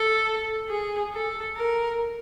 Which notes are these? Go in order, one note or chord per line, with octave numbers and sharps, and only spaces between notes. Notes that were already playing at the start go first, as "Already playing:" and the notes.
Already playing: A4
G#4
A4
A#4